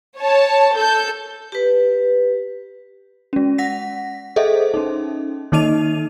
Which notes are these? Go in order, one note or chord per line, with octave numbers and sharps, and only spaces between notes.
C#5 A5
A4 G6
G4 B4
G#3 C#4
F#5 A#6 B6
G#4 A4 C5 D#5 E5
C#4 D#4
D#3 A#3 D#4 D#5 D#7 F7